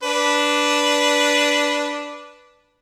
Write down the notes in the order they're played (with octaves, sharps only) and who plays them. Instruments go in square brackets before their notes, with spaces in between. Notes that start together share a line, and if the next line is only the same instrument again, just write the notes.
[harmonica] D4 B4